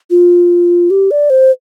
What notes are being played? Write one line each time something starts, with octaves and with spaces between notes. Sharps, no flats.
F4
G4
D5
C5